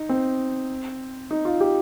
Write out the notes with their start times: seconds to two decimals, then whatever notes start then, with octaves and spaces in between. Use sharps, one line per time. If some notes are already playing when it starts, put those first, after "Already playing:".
Already playing: D#4
0.09 C4
1.31 D#4
1.45 F4
1.60 G4